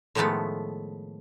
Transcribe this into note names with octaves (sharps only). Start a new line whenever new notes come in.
A2 D#3 F3 G#3 A3 B3